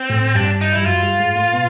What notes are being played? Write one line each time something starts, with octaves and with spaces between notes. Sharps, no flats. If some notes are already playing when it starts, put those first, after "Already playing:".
Already playing: C4
A2
G2 D4
D#4
G2 E4
F#2 F4
G2
G#2
A2
B2